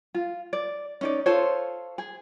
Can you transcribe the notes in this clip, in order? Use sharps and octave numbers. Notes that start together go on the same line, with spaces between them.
F4
D5
C#4 D#4 D5
F4 A4 C5 C#5
G#4